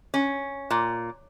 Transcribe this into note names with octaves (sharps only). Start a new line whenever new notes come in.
C#4
A#2